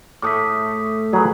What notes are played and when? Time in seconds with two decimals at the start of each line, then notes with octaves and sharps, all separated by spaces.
0.22 A2 A3 D6 D#6 B6
1.13 F#3 G#4 B4